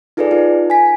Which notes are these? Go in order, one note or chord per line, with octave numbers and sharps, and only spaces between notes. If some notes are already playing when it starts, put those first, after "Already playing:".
D#4 F4 G#4 A4 B4 D5
D#4 F4
G#5 B6